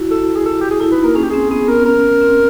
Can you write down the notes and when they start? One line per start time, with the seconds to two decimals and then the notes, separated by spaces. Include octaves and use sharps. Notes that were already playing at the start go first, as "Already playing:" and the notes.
Already playing: E4 F#4
0.11 A4
0.36 G#4
0.46 A4
0.61 G4
0.71 G#4
0.81 E4 A4
0.92 D#4 B4
1.04 A#3 A#4
1.16 C#4 G#4
1.23 G4
1.30 C4 G#4
1.50 B3 G#4
1.68 A#4
1.86 C#4 A#4
2.21 C4